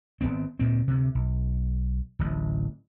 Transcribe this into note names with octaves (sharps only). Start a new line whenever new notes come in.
G#1 A2 B3 C4
D2 A#2 C4
D2 C3
B1
D1 A1